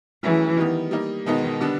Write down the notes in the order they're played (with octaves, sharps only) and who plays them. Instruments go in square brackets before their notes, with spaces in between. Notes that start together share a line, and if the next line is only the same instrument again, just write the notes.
[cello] E3 [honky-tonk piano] F#3 A3 C#4 E4 G#4
[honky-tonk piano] D#3 G3 B3
G3 A#3 D#4
[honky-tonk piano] B2 G#3 B3 D#4 [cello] D#3
[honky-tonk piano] D3 G3 B3 D4